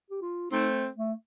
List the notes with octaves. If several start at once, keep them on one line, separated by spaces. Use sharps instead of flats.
G4
F4
A3 C4 D#4
A3